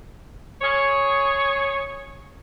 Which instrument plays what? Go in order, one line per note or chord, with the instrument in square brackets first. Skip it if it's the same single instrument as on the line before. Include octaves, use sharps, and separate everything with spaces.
[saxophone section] G#4 C#5